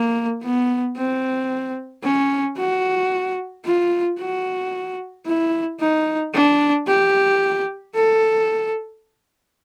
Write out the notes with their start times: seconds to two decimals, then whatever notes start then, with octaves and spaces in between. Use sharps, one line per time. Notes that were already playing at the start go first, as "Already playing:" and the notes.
Already playing: A#3
0.43 B3
0.97 C4
2.04 C#4
2.58 F#4
3.65 F4
4.20 F#4
5.26 E4
5.80 D#4
6.34 D4
6.87 G4
7.95 A4